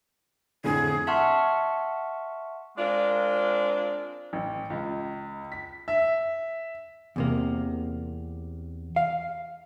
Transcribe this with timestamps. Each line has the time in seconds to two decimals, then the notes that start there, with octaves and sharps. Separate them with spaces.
0.64 F2 A2 D3 G#4
1.07 E5 F#5 A5 C6 C#6 F6
2.77 G#3 C4 D4 F4 A#4
4.33 A1
4.70 C#2
5.52 B6
5.88 E5
7.16 E2 C3 A#3
8.96 F5